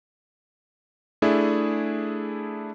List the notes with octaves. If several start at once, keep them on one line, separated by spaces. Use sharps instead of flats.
A3 D4 E4 G#4